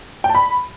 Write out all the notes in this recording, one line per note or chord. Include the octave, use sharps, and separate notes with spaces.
G5
A5
B5